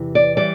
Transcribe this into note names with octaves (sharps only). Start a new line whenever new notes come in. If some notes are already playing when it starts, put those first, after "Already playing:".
Already playing: E2 C3 E3
D5
E3 G3 D5